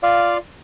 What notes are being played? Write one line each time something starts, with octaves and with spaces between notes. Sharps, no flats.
F4 D5 F5